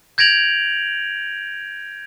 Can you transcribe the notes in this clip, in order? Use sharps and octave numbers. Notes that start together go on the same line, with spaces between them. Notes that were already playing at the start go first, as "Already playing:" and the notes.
G6 G#6 A#6 D7 F7 F#7